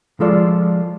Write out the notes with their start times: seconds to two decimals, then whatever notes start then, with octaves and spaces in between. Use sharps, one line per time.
0.20 F3 G#3 F4 A4 D5